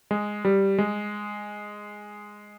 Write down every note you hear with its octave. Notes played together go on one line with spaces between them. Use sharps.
G#3
G3
G#3